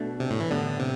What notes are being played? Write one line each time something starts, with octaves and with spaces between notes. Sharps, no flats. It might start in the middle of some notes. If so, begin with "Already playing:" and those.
Already playing: B2 A3 D4
C3
A2
E3
A2 D3 G3 B3 D4
C3